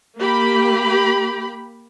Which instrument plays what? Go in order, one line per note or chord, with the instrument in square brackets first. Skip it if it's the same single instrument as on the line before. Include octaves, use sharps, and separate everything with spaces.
[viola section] A#3 G4 B5